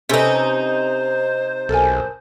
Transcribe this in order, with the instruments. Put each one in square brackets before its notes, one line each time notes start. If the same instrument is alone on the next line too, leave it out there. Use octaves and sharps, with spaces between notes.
[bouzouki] C3 D#4 [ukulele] C#4 A4 B4 [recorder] C5
[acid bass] B1 [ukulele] A4 A#4 G#5